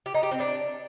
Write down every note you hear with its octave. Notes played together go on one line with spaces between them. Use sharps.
G4
D#4
G4
C4
D4